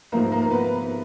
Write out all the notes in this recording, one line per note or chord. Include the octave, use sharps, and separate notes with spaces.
G#2 F3 A3 A#3 A#4
A#3 A#4
A#4
B3 B4